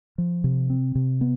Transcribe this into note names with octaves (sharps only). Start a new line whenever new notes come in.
F3
C3
C4
C3
B3